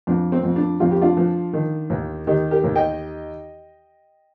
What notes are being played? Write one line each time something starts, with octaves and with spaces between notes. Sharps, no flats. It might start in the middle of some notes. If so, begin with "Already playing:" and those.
F2 D4
C4
F2
D4
F2 F4
G4
D4 F4
F3
D#3
D#2
D#3 D#4 G4
G4 A#4
D#2
D#5 G5